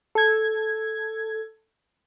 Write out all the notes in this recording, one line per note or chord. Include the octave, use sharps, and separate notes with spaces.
A4 G#6